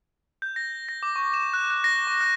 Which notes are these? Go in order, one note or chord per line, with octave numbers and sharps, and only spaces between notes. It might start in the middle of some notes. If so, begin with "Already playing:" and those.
G6
A#6
A#6
D6
C#6
E7
F#6
F#6
A#6
C#6
F#6